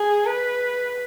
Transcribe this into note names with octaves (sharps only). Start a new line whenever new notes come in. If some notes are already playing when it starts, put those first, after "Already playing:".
Already playing: G#4
B4